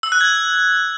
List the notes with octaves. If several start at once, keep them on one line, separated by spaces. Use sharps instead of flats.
E6
F#6
G#6